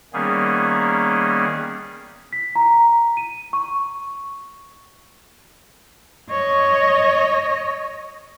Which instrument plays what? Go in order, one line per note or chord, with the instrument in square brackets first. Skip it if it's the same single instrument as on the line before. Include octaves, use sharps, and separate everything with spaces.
[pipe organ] D#3 G3 A#3 B3 C#4 G#4
[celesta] B6
A#5
D#7
C#6
[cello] C#5 D#5